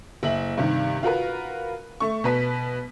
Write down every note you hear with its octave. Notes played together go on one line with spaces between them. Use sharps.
F#1 E5 F#7
G2 C3 D#3
F4 F#4 A#4 B4
A3 C#6
B2 B4 B6